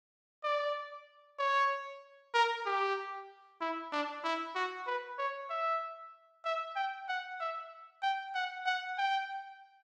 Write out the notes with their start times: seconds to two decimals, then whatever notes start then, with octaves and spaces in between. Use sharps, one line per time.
0.44 D5
1.39 C#5
2.34 A#4
2.66 G4
3.61 E4
3.92 D4
4.24 E4
4.55 F#4
4.87 B4
5.19 C#5
5.50 E5
6.45 E5
6.76 G5
7.09 F#5
7.40 E5
8.03 G5
8.35 F#5
8.66 F#5
8.98 G5